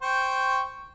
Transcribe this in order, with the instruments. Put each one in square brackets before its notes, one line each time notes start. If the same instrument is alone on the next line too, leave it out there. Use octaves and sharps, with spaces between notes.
[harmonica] C5 G5 C#6